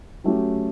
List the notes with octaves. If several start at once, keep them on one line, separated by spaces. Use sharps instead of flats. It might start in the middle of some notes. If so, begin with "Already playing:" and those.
F#3 A3 C#4 G4